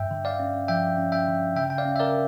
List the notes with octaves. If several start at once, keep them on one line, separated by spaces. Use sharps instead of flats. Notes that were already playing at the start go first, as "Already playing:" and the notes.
Already playing: G2 E5 G5
D3
D5 F5
C#4
F3 E5 G5
C#4
E5 G5
D3
C#3 E5 G5
G5
D5 F5
C#4
E5
A#4 D5